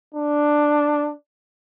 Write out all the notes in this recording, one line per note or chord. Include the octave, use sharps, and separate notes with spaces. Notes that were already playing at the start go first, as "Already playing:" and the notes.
D4